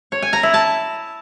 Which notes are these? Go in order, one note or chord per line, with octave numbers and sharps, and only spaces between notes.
C#5
G#5
A#5
E4
A5